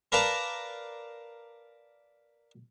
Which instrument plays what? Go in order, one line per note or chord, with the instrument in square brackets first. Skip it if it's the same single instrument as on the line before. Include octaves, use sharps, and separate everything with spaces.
[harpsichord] A#4 B4 D5 F5 A5 A#5